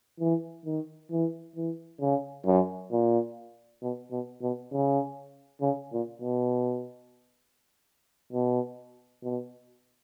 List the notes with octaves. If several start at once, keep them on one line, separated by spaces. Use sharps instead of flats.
E3
D#3
E3
E3
C#3
F#2
A#2
B2
B2
B2
C#3
C#3
A#2
B2
B2
B2